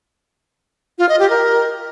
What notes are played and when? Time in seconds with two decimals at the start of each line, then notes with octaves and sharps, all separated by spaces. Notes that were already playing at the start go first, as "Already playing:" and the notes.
0.98 F4
1.09 D#5
1.19 G4
1.30 A#4